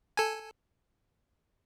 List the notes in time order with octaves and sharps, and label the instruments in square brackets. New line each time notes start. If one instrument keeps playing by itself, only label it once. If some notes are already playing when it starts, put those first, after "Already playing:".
[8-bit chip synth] A4 G#5